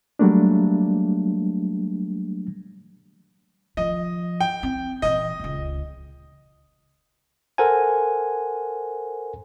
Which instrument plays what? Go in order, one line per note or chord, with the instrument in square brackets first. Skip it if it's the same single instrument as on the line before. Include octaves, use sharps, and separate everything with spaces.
[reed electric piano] F#3 G3 A3 A#3 D4
[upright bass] D#3 F3 [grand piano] D#5
[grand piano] G5
[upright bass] C4 E4
[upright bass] A#2 E3 [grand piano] D#5
[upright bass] D#1 C#2
[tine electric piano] A4 A#4 C5 F#5 G#5